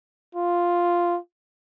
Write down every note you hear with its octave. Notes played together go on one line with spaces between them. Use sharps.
F4